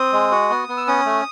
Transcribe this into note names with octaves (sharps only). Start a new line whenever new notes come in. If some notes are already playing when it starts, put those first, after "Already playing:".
Already playing: C4 D#6
G#3
F#4
B3
B3
E6
C#4 D#6
A3